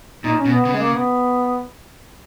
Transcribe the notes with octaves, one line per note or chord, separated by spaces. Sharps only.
A#2 D#4
C#4
B2
B3
C#3 B3
G#3
A#3
B3